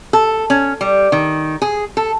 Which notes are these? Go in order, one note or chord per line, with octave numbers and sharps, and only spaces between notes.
A4
C#4
G3
D#3
G#4
A4